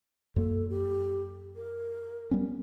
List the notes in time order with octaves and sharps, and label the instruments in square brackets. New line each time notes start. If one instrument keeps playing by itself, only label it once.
[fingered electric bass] F#2 A#3 [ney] A4
[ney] G4
A#4
[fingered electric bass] G3 B3 C#4